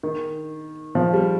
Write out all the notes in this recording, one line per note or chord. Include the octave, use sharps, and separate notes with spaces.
D#3
F3
G3